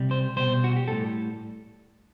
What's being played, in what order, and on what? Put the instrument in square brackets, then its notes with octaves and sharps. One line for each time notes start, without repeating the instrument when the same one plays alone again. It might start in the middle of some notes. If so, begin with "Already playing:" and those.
Already playing: [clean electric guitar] C3 G3
C5
B2 G3 C5
F#4
G4
A2 G3 A4